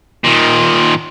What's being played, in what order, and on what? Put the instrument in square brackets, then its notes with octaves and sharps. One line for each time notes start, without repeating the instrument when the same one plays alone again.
[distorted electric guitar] A#2 D#3